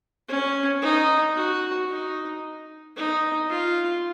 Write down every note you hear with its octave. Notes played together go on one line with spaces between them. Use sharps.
C#4
D#4
F#4
D#4
D#4
F4